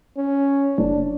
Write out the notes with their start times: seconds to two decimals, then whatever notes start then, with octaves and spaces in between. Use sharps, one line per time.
0.17 C#4
0.78 F#1 D4